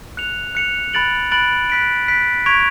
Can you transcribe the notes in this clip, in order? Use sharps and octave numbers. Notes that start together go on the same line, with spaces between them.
F#6 C#7 F7
F#6 C#7 F7
B5 F#6 A6 D7 F#7
B5 F#6 A6 D7 F#7
F#6 B6 D7
F#6 B6 D7
C#6 G#6 B6 D7 F7